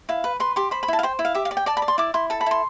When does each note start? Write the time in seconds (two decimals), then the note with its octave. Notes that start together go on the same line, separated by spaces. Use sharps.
0.09 E4 F5
0.24 B4
0.40 B4 C6
0.56 G4 C6
0.71 C5 B5
0.83 B5
0.88 E4 A5
0.99 F5
1.03 C5 G5
1.19 E4
1.25 F5
1.35 G4 E5
1.45 F5
1.51 D5
1.57 G5
1.66 D5 A5
1.77 B5
1.82 D5
1.88 C6
1.98 E4 D6
2.14 E4 C6
2.30 A4 A5
2.41 B5
2.46 E4 C6